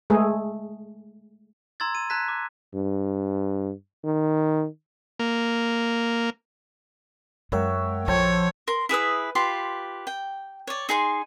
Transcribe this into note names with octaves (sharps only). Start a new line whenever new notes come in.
G#3 A3 G#4
A#5 C6 E6 G#6 A6
D#7
A5 A#5 F#6 G#6 B6
D6
G2
D#3
A#3
F#2 G#3 F#4 A#4 C#5 E5 G5
A#1 F3 A4 C5 C#5 G5
A#4 C6
E4 G#4 B4 D#6
F4 G4 B4 C6
G5
C#5 D5
D#4 G#4 G#5 C6